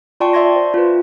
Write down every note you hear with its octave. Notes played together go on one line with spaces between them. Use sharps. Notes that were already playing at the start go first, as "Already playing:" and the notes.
F4 D5 G5 A5 C6 C#6
D5 E5 C6 G#6 A#6
C5
F4 B4